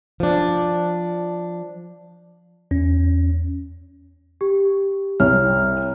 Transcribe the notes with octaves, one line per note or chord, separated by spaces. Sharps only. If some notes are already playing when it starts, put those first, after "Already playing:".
F3 D4
E2 C#4
G4
C2 C#5 F6